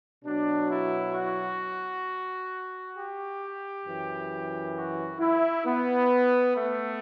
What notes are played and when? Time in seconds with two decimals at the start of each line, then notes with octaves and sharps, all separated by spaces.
0.24 B2 F#3 D4
0.69 E4
1.14 F#4
2.95 G4
3.85 F#2 E3
4.75 F#4
5.20 E4
5.65 B3
6.56 A3